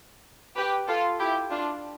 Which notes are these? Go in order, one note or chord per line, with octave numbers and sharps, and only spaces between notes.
G4 B4
F4 A4
E4 G4
D4 F4